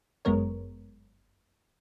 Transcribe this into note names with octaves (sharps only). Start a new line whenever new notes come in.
G1 F#2 G#3 B3 A#4 C#5